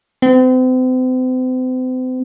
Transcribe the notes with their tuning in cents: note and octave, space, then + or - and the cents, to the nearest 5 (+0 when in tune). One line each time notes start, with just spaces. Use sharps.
C4 -40